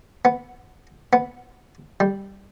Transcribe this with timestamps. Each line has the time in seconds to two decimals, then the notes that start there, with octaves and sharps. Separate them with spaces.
0.25 B3
1.13 B3
2.00 G3